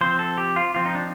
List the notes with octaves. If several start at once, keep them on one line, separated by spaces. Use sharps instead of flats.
F3 C4 C5
A4
G4
F4
F3 C4 F4
D#4
D4